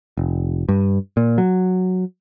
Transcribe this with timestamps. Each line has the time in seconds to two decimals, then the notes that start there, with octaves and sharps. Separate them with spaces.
0.17 F1
0.69 G2
1.17 A#2
1.38 F#3